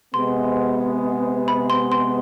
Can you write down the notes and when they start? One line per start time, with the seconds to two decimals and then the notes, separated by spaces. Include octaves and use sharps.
0.13 C3 G#3 B3 C6
1.48 B5
1.70 C6
1.92 C6